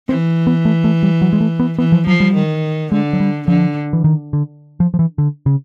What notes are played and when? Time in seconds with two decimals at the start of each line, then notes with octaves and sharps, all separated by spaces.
0.08 E3 C4
0.47 B3
0.65 A3
0.84 A3
1.03 G3
1.22 F#3
1.33 G#3
1.41 A3
1.60 B3
1.78 E3 B3
1.92 F3
2.07 F3 F#3
2.20 G3
2.34 D#3
2.92 D3 G#3
3.13 F#3
3.20 G3
3.48 D3 F3
3.93 E3
4.04 D#3
4.33 D3
4.80 F3
4.94 F3
4.99 E3
5.18 D3
5.46 C#3